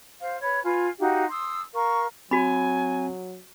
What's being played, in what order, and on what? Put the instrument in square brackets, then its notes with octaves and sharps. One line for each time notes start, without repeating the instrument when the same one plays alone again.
[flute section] C5 F5
B4 C#5 B5
F4 B4 G#5
D#4 F#4 G4 F5
C6 D#6 E6
A#4 F5 C#6
[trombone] F#3 [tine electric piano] C4 [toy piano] F#4 B5 [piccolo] G#5